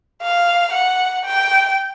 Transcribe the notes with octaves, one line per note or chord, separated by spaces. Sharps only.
F5
F#5
G5